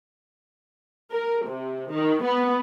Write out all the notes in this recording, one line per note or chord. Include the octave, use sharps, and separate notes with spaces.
A#4
C3
D#3
B3